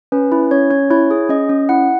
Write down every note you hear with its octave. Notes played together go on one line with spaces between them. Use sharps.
C#4 B4
E4
C#4 C#5
C#4 C#5
E4 C#5
G#4
C#4 D#5
C#4
E4 F#5